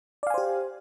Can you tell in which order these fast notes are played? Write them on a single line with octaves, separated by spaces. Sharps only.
D5 F5 G#5 C5 G4